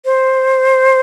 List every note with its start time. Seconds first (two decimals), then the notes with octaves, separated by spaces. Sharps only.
0.05 C5